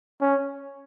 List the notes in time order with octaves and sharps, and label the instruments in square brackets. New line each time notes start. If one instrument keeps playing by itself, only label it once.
[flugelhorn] C#4